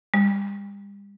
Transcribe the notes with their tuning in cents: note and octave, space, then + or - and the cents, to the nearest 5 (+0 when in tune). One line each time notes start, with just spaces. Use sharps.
G3 +40